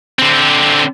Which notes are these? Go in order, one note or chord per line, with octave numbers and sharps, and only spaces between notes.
D3 C4